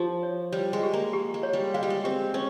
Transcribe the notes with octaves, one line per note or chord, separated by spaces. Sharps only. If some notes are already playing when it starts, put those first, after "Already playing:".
Already playing: F3 G4
C#5
G3 C#5
G#3
G4
A#3
G4
G#3
C#5
G3
G#3 F5
G3
G#3
C4 G4
C#4 C5